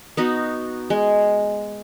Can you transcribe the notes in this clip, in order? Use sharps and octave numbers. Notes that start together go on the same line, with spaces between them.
B3 D#4 F#4
G#3